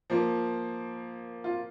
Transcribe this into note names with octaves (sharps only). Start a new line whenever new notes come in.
F3 A#3
F4